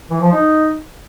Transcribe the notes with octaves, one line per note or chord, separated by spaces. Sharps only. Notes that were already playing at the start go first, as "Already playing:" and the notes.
E3
F3
D#4